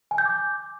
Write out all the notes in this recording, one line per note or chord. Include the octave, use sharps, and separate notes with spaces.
G#5
G6
D6